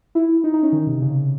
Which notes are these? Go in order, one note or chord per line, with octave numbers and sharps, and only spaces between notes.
E4
D#4
D#4
C#4
D#3
C3
C3
C#3